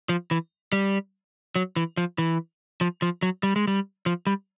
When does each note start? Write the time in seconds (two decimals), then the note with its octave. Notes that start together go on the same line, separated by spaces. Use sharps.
0.09 F3
0.31 E3
0.72 G3
1.56 F#3
1.76 E3
1.97 F3
2.18 E3
2.81 F3
3.02 F3
3.22 F#3
3.43 G3
3.56 G#3
3.67 G3
4.06 F3
4.27 G3